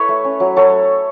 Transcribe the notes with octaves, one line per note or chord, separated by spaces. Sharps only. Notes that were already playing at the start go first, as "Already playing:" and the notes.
Already playing: E4 A4 B4 C#5 E5
A3
C#4
F#3
F#3 A4 C#5